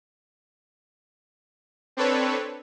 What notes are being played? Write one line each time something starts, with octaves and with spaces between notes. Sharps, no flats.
C4 D4 A4 B4 C#5